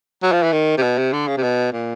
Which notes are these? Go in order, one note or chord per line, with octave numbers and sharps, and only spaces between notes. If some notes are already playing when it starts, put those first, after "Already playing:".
F#3
F3
E3
D#3
C3
B2
C3
D3
C#3
C3
B2
A#2